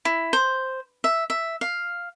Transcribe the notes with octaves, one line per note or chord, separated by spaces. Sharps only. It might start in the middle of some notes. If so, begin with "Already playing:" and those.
E4
C5
E5
E5
F5